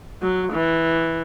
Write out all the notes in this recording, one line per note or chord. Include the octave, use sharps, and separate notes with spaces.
F#3
E3